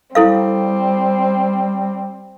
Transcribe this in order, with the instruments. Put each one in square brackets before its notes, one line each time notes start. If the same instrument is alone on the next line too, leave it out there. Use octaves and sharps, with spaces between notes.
[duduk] G3 [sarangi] C4 [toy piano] E4 A4 F5